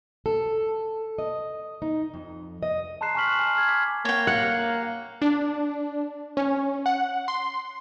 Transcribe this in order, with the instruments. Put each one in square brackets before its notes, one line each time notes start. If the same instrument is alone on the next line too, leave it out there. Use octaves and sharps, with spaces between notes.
[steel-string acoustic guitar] A4
D#5
D#4
F2
D#5
[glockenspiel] A5 A#5 C6 F#6 C7 E7
G#5 A5 C#6 F6 B6 F#7
F#6 E7
G#5
F6 G#6
D6 B6
[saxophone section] A#3 [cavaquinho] C#5 G5
[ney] F5 [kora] F#5
[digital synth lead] D4
C#4
F#5
C6